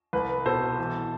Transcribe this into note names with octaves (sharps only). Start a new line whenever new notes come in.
C2 B4
B2 A4 C5
E3